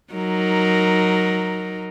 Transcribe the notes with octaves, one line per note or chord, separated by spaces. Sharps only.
F#3 D#4 A#4